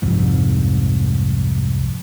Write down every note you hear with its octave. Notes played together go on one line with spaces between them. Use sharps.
C2 F2 G#2